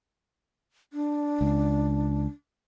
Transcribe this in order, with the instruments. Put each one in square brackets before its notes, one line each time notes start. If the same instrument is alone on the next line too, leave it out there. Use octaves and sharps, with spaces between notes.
[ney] D4
[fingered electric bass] C#2